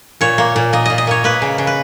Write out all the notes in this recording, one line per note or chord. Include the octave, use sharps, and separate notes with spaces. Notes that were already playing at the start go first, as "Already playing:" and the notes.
A#2 C#5
A#3
A#2
A#3 D#5
A#2 D#5
D#5
A#3 C#5
A#3 B4
C#3
C#3
B4